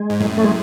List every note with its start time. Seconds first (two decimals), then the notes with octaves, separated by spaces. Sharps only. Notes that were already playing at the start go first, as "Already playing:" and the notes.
Already playing: G#3
0.10 G#2
0.20 F#2 A2
0.37 A3
0.44 G#3